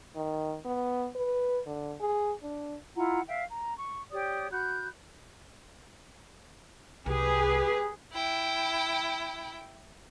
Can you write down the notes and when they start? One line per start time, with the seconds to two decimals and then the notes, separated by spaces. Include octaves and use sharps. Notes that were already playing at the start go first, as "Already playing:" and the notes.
0.16 D#3
0.65 B3
1.15 B4
1.66 D3
2.00 G#4
2.42 D4
2.95 E4 F4 F#5 A#5
3.26 E5 F5 G5
3.50 A#5
3.78 C#6
4.11 G4 C#5 D5 D#6
4.51 F#4 B5 F#6 G6
7.06 C2 G4 G#4 B4
8.13 E4 G5